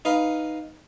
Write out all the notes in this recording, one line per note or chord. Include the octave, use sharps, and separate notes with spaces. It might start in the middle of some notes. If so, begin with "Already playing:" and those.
D#4 B4 F5